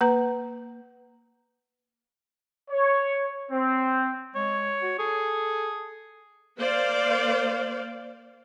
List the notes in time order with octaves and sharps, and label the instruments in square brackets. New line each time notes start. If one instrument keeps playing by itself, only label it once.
[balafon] A#3 B4 A#5
[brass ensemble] C#5
C4
[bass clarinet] G#3 [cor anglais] C#5
[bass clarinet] F#4
[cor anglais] G#4 [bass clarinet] A4
[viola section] A#3 C5 D5 F5